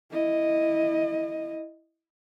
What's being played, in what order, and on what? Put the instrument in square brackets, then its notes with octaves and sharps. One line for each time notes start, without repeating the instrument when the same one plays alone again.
[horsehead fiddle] E4 D#5